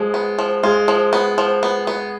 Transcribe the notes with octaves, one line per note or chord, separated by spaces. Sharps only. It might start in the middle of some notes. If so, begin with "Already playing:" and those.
Already playing: F3 G#3
B3
F3
G#3 F4
F3
B3
F3
B3
B3